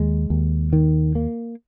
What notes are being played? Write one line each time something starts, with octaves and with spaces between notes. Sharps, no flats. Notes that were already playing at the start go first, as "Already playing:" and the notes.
Already playing: D#2 G#3
D#2
D#3
A#3